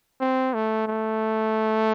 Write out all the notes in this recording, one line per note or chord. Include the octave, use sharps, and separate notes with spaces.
C4
A3
A3